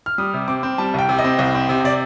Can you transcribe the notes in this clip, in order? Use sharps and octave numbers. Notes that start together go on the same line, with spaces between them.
F6
G3 D#6
C3
C4 D6
C4
G3 A5
C2 G5
C3
D#5
C4
C2
C4
C3
C3 D5